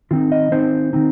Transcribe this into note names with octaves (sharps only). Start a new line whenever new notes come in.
D#3 C4 D#4 F4
D#5
D#3 C4 D#4 C5
D#3 C4 D#4